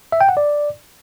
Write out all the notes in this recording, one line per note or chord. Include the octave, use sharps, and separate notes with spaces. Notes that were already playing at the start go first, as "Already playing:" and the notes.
E5
G5
F#5
D5